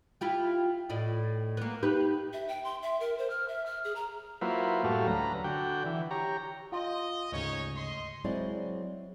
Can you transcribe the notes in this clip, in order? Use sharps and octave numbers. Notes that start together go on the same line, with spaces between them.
E4 F4 G4
A2 D5 D#5
A#3 B3
D#4 G4 B4
E5
G5
C6
E5
A#4
C5
F6
E5
F6
G#4
A#5
F#3 A#3 E4 F4 B4 C5
F#2 A2 F#3 G3 A3 F5
D2 B4 A#5
D3 F#4 G5
E3
G4 C#5 A#5
F4 D#5
D2 G#2 C#3 C#4 D#4 C#5
D#5 C6
F#3 G#3 C4 E4 D5